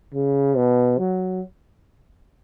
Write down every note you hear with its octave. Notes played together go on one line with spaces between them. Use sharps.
C#3
B2
F#3